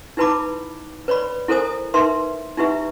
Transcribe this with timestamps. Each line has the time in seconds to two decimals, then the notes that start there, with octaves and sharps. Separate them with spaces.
0.17 D#4 E4 B4 A5 B5 D6
1.08 B4 C#5 D5 B5
1.48 E4 A4 A#4 C5 G#5 D#6
1.94 D#4 A#4 B4 E5 C6
2.58 D#4 E4 G4 B4 E5